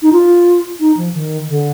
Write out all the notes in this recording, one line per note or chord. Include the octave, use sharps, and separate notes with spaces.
D#4
F4
D#4
F3
D#3
D3